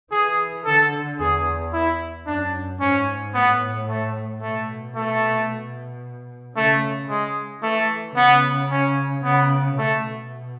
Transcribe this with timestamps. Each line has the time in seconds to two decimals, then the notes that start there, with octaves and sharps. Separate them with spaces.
0.12 E3 G#4
0.65 D3 A4
1.19 E2 G#4
1.73 E4
2.26 F#2 D4
2.80 G#2 C#4
3.34 A2 B3
3.87 A3
4.41 B2 A3
4.95 A3
6.56 C#3 A3
7.09 G#3
7.62 E3 A3
8.16 C#3 B3
8.71 C#4
9.24 C#3 B3
9.77 B2 A3